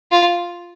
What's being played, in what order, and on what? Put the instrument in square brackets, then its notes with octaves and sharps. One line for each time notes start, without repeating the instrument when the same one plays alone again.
[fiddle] F4